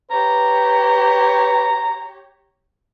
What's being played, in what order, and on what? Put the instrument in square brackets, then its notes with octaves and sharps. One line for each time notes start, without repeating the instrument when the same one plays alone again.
[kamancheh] G4 C#5 [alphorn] B4 [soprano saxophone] A#5